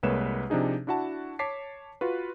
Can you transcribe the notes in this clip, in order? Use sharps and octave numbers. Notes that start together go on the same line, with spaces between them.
C2 G#3 A#3 B4 C#5 E7
C3 F3 D4 D#4 G#4
D4 E4 F#4 F#5 A5
C#5 A5 D6 B6 C7
F4 F#4 B4